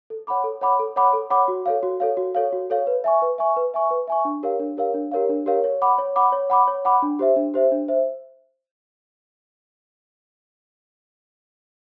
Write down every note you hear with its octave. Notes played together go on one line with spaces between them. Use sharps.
A4
C#5 F#5 B5 D6
A4
C#5 F#5 B5 D6
A4
C#5 F#5 B5 D6
A4
C#5 F#5 B5 D6
F#4
A4 C#5 F5
F#4
A4 C#5 F5
F#4
A4 C#5 F5
F#4
A4 C#5 F5
B4
E5 G#5 C#6
B4
E5 G#5 C#6
B4
E5 G#5 C#6
B4
E5 G#5 C#6
D4
G4 A#4 C#5 F5
D4
G4 A#4 C#5 F5
D4
G4 A#4 C#5 F5
D4
G4 A#4 C#5 F5
C#5
F#5 B5 D6
C#5
F#5 B5 D6
C#5
F#5 B5 D6
C#5
F#5 B5 D6
D4
G4 C5 E5
D4
G4 C5 E5
D4
C5 E5